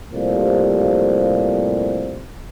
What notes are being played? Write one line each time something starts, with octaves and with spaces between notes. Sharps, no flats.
A2 C3 F3 G3 A#3